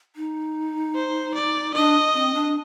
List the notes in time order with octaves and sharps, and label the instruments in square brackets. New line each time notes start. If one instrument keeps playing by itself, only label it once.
[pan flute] D#4
[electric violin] C5
D5
[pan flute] D4 [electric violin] D#5
[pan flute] C4
D4